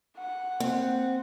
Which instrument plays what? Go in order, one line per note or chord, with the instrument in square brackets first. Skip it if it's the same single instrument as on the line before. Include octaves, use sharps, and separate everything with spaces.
[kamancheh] F#5
[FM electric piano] A#3 [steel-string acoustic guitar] C4